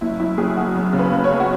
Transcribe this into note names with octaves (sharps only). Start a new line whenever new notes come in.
F#1 E4
F#2 E4
F#1 G#4
F#1 F#4
F#2
C#3
B4
F#1
C#5
F#1
F#4